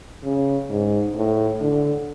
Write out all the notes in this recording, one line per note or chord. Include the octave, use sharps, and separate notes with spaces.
C#3
G#2
A2
D3